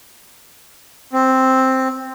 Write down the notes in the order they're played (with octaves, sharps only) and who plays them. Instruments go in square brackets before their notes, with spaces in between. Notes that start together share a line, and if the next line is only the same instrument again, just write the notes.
[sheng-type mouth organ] C4